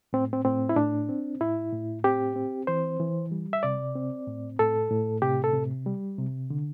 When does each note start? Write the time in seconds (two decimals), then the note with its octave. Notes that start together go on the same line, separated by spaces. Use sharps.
0.13 A2 C4
0.33 C4
0.45 A2 C4
0.69 E4
0.76 A2 D4
1.09 C4
1.41 A2 E4
1.72 A2
2.04 C4 G4
2.36 C4
2.67 E3 C5
3.00 E3
3.32 G3
3.53 E5
3.63 C3 D5
3.96 C4
4.27 A2
4.59 A2 A4
4.91 A2
5.22 C3 G4
5.44 A4
5.54 C3
5.86 G3
6.18 C3
6.50 D3